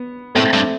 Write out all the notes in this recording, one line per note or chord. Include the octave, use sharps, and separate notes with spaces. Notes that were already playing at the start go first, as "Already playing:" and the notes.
Already playing: B3
A2 A3 C4
G2